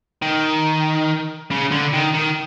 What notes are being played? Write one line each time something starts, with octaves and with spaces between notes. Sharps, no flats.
D#3
C#3
D3
D#3
D#3